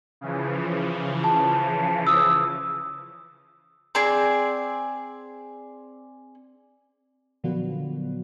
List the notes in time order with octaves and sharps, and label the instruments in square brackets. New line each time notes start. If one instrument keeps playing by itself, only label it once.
[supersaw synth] C#3 E3 F3
[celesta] A5
D#6 E6
[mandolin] C4 G#4 D5
[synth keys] A#2 D3 F3 F#3 B3 F#4